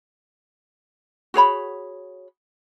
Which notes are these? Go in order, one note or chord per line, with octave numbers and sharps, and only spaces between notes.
F#4 G#4 C#5 B5